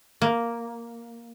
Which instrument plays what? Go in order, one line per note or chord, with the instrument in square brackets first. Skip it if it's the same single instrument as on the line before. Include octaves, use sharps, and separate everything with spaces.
[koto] A#3